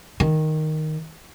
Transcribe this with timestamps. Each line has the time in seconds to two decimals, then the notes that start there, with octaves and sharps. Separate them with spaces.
0.20 D#3